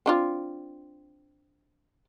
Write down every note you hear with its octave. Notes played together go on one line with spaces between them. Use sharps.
C4 D4 F4